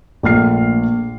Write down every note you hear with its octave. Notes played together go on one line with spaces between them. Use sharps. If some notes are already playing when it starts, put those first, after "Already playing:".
A#1 A3 F6 C7